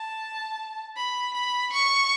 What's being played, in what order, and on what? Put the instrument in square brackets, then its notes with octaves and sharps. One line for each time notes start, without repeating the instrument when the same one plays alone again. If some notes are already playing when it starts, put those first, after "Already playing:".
Already playing: [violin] A5
B5
B5
C#6